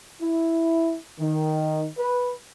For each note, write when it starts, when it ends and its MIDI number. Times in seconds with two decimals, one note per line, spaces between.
0.22 0.97 64
1.20 1.88 51
1.99 2.35 71